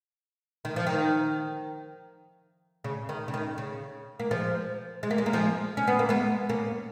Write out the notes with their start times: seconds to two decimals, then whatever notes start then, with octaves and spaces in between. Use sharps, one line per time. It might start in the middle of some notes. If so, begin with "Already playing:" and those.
0.65 D#3
0.76 F3
0.87 D#3
2.84 C#3
3.09 D#3
3.28 C#3
3.34 D#3
3.58 C#3
4.20 A#3
4.31 F3 G#3
5.03 G#3
5.11 A#3
5.18 G#3
5.26 A#3
5.33 F3 G#3
5.77 C#4
5.88 B3
5.99 A#3
6.09 G#3 B3
6.49 A#3 C#4